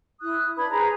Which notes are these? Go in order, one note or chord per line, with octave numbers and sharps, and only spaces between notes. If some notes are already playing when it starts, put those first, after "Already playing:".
E4 D#6 F#6
D4 B4 B5 G#6
G#4 B4 C5 A#5